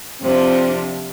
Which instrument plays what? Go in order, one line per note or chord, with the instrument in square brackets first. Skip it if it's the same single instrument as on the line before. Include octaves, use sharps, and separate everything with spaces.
[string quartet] F2 C3 F3 D4 [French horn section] C4